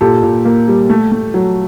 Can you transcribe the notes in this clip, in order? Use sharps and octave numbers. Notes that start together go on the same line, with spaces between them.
A#2 G4 A4
A#2
A#3
G3
A3
A3
F#3